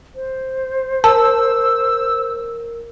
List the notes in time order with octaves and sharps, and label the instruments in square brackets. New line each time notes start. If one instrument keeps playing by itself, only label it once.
[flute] C5
[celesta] A#4 [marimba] A5 [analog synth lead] E6